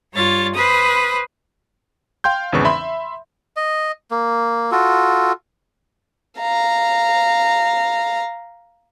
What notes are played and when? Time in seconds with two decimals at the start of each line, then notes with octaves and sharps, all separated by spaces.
0.14 G2 G3 F4 C#5 A6
0.55 B4 C5 B5 D#6
2.24 F5 G5 C6 G6
2.52 G#1 E2 C#3 B4 C#6
2.65 E5 B5 C6
3.56 D#5
4.11 A#3
4.72 F4 F#4 A4
6.39 F5 A#5